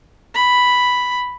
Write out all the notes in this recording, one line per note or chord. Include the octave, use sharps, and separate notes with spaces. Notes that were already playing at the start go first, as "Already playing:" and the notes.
B5